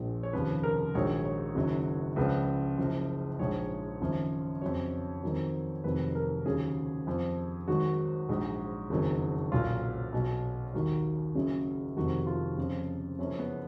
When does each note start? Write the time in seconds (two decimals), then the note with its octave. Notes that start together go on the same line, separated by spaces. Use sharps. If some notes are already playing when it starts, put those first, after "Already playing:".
Already playing: A#1 A#2 F3
0.23 C#5
0.33 F1 D#2 C#3 F3 B4
0.63 A#4
0.95 A#1 G#2 D#3 F#3 C#5
1.25 C#5
1.55 F#1 F#2 D#3 F#3
2.16 C#2 C#3 F3 B4
2.78 F#1 F#2 F3
3.39 A#1 G#2 F3 C#5
4.01 G#1 F#2 C#3 F3
4.62 F2 C#3 F#3 C#5
5.23 F2 D#3 F#3
5.84 F1 F2 D#3 F#3 B4
6.15 A#4
6.46 D#2 C#3 F#3 G#4
7.07 F2 F3
7.68 G#1 G#2 D#3 F#3 F#4
8.29 A#1 G#2 F#3
8.90 F#1 F2 D#3 F#3
9.52 B1 A#2 F#3 F4
10.12 B1 B2 F#3
10.73 D#2 D#3 F#3 F#4
11.35 F#1 F#2 C#3 F#3
11.97 F1 F2 D#3 F#4
12.27 F4
12.58 F2 C#3 F3
13.19 F#1 F#2 F3 C#4
13.39 B3